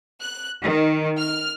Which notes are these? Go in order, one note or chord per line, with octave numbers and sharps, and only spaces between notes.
F#6
D#3
F6